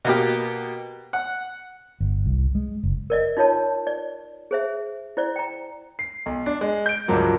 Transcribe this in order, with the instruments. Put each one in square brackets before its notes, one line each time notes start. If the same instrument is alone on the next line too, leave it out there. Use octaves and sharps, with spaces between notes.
[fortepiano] B2 A#3 G4
F#5
[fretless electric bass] G1
C2
G#3
F#1
[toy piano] A#4 D5 D#5
D#4 F4 C#5 A5
D5
G#4 C5 E5
E4 C5 D5
G5 A#5
[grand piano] C7
B1
D4
G#3
G6 D7
C#2 G2 A#2 F3 F#3 A#3